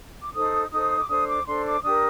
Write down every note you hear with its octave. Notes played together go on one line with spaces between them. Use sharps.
D6
D#4 A4 C5 D#6
D#4 A4 C5 D#6
D6
D4 A4 C5 D#6
D6
D4 A4 C5 C6
D6
D4 G4 A#4 D#6